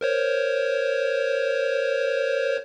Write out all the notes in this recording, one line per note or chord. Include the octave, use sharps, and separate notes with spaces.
A#4 C5 C#5